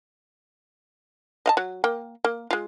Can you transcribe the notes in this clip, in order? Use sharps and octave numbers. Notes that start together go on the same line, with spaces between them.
D#5 F5 A5
F#3
A#3 G5
A#3
G#3 F4